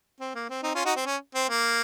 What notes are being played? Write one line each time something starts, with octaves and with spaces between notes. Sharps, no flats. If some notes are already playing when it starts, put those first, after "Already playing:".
C4
A#3
C4
C4 D#4
C#4 F4
D#4 F#4
C4
C#4
C4
A#3